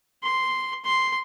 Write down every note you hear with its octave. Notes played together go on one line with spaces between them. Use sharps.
C6
C6